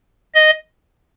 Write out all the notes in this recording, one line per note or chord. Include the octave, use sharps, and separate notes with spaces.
D#5